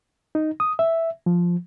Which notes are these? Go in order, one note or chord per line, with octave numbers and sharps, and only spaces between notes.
D#4
D#6
E5
F3